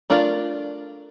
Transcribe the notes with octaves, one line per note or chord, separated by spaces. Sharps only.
A3 D4 F4 A#4 D5